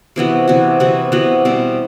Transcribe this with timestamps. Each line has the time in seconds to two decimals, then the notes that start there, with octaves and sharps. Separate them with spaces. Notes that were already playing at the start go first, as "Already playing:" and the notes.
0.16 C3 E3 B3 F#4
0.48 C3 E3 B3 F#4
0.80 C3 E3 B3 F#4
1.12 C3 E3 B3 F#4
1.45 B2 G3 C4